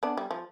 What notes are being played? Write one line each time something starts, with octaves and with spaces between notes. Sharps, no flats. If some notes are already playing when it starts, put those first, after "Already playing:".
B3 D4
G3
F3